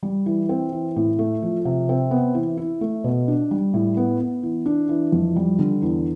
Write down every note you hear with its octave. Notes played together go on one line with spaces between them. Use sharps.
G3
E3
C4
E3
A2
A3
F3
C3
C4
B3
E3
E4
A3
B2
D4
G3
A2
B3
B3
E3
D4
E3
F2
G3
D3
E2